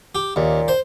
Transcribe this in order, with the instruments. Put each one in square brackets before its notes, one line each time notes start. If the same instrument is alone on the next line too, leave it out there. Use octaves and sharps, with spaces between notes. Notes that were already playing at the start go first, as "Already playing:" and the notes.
[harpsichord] G4
[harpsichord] D#2 [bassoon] A#2
[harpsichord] C5